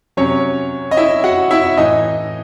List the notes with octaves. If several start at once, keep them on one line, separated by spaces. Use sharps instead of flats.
C3 F#3 C#4 C#5
D#5
E4 E5
F#4 F#5
E4 E5
A2 E3 D#4 D#5